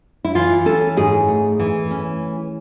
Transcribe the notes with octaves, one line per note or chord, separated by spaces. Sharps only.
E4
E3 F4
C#4 A4
G#2 G#4
A3
E3
C#4